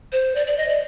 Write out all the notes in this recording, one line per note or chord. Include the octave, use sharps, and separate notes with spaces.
C5
D5
D5
D#5
D5